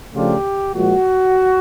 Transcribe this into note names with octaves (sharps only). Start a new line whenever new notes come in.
C#3 F3 A3 D4 F4 G4
A#2 F3 G#3 F#4